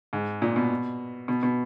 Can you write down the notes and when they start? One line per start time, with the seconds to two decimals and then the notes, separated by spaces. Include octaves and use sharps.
0.13 G#2
0.42 A#2
0.56 B2
1.28 B2
1.43 B2